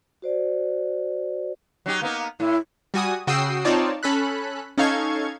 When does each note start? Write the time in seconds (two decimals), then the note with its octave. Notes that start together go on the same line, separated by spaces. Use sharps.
0.22 F#4 C5 D5
1.86 F#3 D#4 G4
2.02 A#3 B3 D#4
2.40 A2 E4
2.94 G3 F#4 G#5 D#6
3.27 C#3 F#4 G5 D#6 E6 C7
3.65 C4 D#4 F4 C#5 D5 A5
4.03 C#4 A4 B5 F#6
4.78 C#4 D#4 A4 F5 C#6 G#6